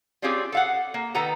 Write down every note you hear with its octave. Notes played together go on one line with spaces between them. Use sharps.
G3 C4 C#4 F4 G4 G#4
A4 F5 F#5
A#3
D#3 B3 A4 B4 F#5 A#5